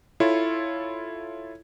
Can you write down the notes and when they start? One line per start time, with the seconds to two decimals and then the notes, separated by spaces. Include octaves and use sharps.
0.20 E4 F4 A4 C#5